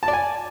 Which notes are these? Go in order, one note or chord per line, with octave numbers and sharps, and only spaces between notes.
A5
D5
G#5